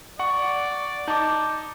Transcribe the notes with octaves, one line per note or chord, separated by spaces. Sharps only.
D5 F#5 C#6
D#4 A5 D6 G6